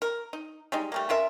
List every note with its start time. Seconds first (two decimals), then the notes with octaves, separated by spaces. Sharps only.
0.02 A#4
0.33 D#4
0.72 G3 G#3 D#4
0.92 G3 A3 A#3
1.09 C#4 F4 A#4 E5